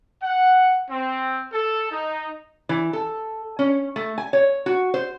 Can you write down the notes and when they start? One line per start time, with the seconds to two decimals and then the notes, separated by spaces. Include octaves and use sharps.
0.22 F#5
0.89 C4
1.52 A4
1.90 D#4
2.69 E3
2.93 A4
3.59 C#4
3.96 A3
4.18 G#5
4.33 C#5
4.66 F#4
4.94 C5